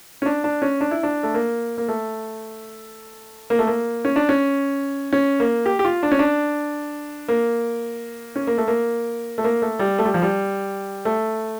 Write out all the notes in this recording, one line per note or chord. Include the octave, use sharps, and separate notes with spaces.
C#4
D4
D4
C#4
D4
E4
D4
A3
A#3
A#3
A3
A#3
A3
A#3
C#4
D4
C#4
C#4
A#3
G4
G4
F4
D4
C#4
D4
A#3
C#4
A#3
A3
A#3
A3
A#3
A3
G3
A3
G3
F3
G3
A3